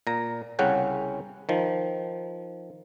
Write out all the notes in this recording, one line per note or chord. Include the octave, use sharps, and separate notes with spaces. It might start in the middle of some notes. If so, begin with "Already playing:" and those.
A#2 A#5
C2 C#3 C#4 F#5 G5
D#3 F3